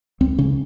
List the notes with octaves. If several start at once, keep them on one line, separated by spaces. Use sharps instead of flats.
C#2 C4
C#3 C#4